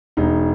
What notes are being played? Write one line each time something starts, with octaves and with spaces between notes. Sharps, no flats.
E1 D#4